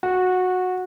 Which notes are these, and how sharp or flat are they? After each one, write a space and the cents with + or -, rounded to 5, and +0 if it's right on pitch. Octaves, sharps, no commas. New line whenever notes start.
F#4 -15